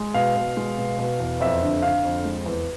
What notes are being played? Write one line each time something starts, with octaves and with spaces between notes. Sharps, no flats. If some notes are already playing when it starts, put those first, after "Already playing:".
Already playing: G#3
B2 F5
B2
G#3
B2
B2
E2
F2 E5
D3
D3 F5
F2
G#3
E2